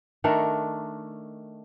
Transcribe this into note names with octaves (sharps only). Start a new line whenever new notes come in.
D#3 A3 D4 A#4